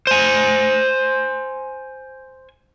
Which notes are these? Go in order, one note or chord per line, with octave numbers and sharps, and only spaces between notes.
C5 G#5